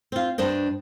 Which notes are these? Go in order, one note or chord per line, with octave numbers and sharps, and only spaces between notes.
C4 F4
G2 D4 C5 D#5